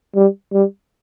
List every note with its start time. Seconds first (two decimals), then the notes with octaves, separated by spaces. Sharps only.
0.16 G3
0.53 G3